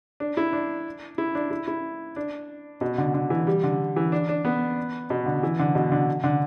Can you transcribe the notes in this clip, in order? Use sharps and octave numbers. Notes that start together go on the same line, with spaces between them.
D4
E4
D4
E4
D4
E4
E4
D4
B2
D3
D3
E3
G3
D3
E3
D4
D4
B3
B2
D3
E3
D3
B2
D3
D3